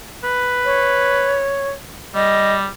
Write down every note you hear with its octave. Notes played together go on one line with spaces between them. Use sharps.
B4
C#5
G3 D#5